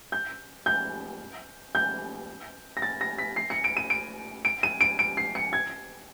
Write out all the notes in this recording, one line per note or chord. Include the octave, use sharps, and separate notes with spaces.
G6
G6
G6
A#6
A6
A#6
B6
C7
C#7
D7
D#7
D7
D7
D#7
D7
D7
C7
C#7
G#6